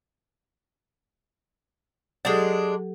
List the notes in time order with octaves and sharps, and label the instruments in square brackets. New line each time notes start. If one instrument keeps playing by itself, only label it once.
[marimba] F#3 G4 A4 [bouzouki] G#3 D4